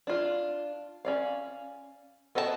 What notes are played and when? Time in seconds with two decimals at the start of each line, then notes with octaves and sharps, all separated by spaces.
0.07 D4 F4
1.05 C#4 D5 F5
2.35 B3 A4 D#5 F#5 A5